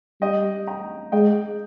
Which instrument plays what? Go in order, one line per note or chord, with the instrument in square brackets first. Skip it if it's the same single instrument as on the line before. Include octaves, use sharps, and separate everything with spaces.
[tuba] G3 [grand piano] D#5 G5
[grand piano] G5 A#5
[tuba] G#3 [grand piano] D#5 G5